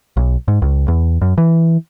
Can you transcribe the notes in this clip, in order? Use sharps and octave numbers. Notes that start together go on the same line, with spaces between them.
B1
G#2
C#2
E2
F#2
E3